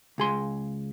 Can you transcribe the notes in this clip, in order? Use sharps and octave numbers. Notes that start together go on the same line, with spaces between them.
C#2 G#4 C6